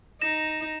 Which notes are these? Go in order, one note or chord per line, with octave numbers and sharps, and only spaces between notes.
D#4 A#6 E7